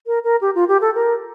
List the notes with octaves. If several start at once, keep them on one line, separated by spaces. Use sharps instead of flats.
A#4
A#4
G4
F4
G4
A4
A#4